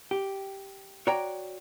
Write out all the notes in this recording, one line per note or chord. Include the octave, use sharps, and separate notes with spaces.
G4
F#4 C#5 D5 G5 A#5